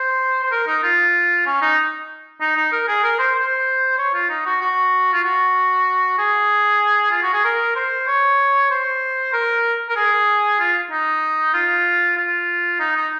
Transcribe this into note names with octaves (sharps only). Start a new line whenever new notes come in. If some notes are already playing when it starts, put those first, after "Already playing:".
Already playing: C5
C5
A#4
D#4
F4
C#4
D#4
D#4
D#4
A#4
G#4
A#4
C5
C5
C#5
F4
D#4
F#4
F#4
F4
F#4
G#4
F4
F#4
G#4
A#4
C5
C#5
C5
A#4
A#4
G#4
F4
D#4
F4
F4
D#4
D#4